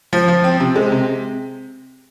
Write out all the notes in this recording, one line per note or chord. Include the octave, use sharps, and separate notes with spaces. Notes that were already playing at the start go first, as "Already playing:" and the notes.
F3
F3
C4
C3
G#3
C3